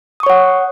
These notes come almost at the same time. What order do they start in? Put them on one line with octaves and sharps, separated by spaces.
D#6 C#6 C#5 F#5